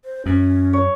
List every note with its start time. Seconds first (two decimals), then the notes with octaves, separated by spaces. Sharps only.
0.05 C5
0.26 F#2 C#4
0.73 C#5